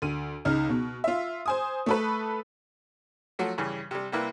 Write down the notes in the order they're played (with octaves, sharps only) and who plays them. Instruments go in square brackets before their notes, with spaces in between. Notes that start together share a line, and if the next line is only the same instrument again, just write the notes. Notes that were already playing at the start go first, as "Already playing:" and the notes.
[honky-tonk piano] D2 D#7
C#2 D#4 F6
B2
F4 E5
C5 G#5 D#6
A3 A4 B4
[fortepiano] F3 F#3 A3 F#4
G2 C#3 E3
C3 G3
C3 G3 A#3 E4 B4